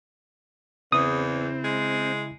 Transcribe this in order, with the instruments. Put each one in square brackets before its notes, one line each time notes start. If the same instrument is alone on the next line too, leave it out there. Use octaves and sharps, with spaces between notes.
[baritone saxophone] E2 [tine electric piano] C#3 E4 [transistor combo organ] C4 [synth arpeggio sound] D#6
[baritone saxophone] G#3